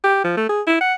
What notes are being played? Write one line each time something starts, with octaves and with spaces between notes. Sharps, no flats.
G4
F3
A3
G#4
E4
F#5